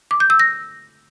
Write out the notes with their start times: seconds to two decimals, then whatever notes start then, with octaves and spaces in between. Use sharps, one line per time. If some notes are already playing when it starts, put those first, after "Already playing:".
0.11 D6
0.20 G6
0.30 E6
0.39 A#6